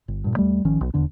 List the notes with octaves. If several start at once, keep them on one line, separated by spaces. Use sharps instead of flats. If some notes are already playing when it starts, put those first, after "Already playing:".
G1
G2 A#2
D#2 G3 A3
G#1 D#3 F3 C#4
B1
D#1 E2 D3 D4